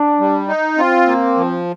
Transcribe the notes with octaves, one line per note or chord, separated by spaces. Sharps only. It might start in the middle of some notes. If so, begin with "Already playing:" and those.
Already playing: D4
G3
D#4
C4 F4
A#3
F3